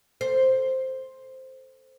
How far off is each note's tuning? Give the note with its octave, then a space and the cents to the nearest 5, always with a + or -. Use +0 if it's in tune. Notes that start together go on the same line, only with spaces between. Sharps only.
A4 +0 C5 +0